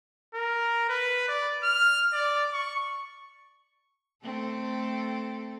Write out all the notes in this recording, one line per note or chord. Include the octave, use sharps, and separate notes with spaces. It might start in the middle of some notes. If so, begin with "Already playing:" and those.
A#4
B4
D5
F6
D5
C#6
A3 C4 A4